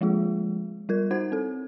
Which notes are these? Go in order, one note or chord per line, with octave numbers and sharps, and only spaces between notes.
F3 G#3 A#3 F4 G#4
G3 F4 A#4 G#6
D#4 F#4 C5 F#5 G#6
C4 A4